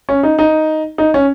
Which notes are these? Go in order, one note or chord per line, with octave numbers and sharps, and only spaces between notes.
C#4
D#4
D#4
D#4
C#4